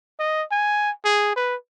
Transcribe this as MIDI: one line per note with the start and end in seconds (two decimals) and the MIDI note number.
0.19 0.44 75
0.51 0.91 80
1.05 1.36 68
1.36 1.55 71